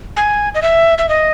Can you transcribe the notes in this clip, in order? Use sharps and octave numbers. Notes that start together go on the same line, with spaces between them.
G#5
D#5
E5
E5
D#5